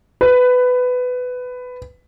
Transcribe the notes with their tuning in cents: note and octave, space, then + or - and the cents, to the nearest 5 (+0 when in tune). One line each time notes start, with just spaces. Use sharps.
B4 +15